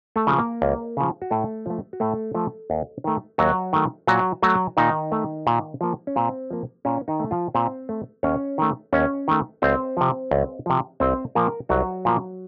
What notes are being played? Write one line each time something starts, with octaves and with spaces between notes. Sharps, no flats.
A3 A4
C#3 F3
A#3 A#4
C#2
C#3 F3
F#4
A2 A3 A4
F3 A3
F#4
A2 A3 A4
F3 A3
D#2
D#3 A3
D#2 F#3 F#4
D#3 A3
A#2 F#3 F#4
F#3 A3 F#4
A#2 D#3 D#4
A3
A#2
F3 A#3
C#4
A#2 C4
F3 A#3
A#2 C#4
D#3 D#4
A3
F3 F4
A#2 C4 C5
A3
D#2 C#4 C#5
D#3 A3
D#2 C#4 C#5
D#3 A3
C#2 C4 C5
C3 F3
C#2
C3 F3
C2 C4 C5
A#2 F3 A#3 A#4
C2 F#3 F#4
A#2 F3 A#3